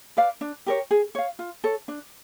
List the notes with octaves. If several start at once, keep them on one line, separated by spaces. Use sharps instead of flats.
B4 D5 F5
D4
G4 A#4 C#5
G#4
C#5 F5
F4
A4 C#5
D4